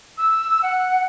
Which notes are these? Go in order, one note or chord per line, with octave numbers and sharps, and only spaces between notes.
E6
F#5